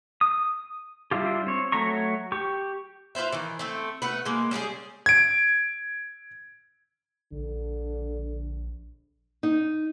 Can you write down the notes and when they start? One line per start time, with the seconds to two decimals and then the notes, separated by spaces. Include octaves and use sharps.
0.21 D#6
1.11 G3 D4 E4 F4 G4
1.47 C4 C#5
1.72 F#3 A3 C#5 A#5 C#6
2.32 G4 C#6
3.15 F4 B4 C5 E5
3.33 D#3 E3
3.59 A3 C4
4.02 A3 F#4 B4
4.25 G#3 A#3
4.51 G3 C#4 D#4 G#4
5.06 G#6 D7
7.32 A#1 D3
9.43 D#4